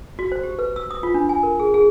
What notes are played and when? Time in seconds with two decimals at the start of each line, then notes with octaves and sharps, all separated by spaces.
0.19 F#4
0.32 C5
0.43 G4
0.59 B4
0.76 E6
0.91 D#6
1.03 F4
1.14 D4
1.29 G#5
1.43 A#4
1.60 G#4
1.74 G#4